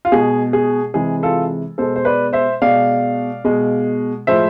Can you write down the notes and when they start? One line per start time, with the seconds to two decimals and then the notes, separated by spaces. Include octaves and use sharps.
0.05 F4
0.12 B2 G#3 G#4
0.53 G#4
0.94 C3 E3 G#3 G#4
1.23 F4 A4
1.78 B2 G#3 A4 C5
1.96 C5
2.05 B4 D5
2.33 C5 E5
2.61 B2 G#3 D5 F5
3.44 B2 G#3
4.27 A2 F3 G#3 C5 E5